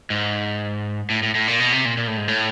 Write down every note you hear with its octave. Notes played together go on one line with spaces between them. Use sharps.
G#2
A2
A2
A2
A#2
B2
C3
A#2
A#2
A2
G#2
A2